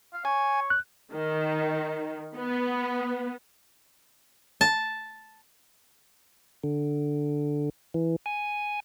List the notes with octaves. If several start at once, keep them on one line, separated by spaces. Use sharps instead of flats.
F5
C#5 G#5
F#6
D#3
B3
A5
D3
E3
G#5